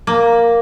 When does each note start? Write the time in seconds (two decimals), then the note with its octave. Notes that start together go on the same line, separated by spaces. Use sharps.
0.07 A#3